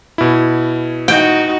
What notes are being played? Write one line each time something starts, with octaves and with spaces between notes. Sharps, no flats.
B2 E4
D#4 F#4 G5